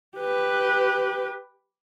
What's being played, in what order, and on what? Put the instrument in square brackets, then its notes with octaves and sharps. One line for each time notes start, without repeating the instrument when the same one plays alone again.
[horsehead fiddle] G4 B4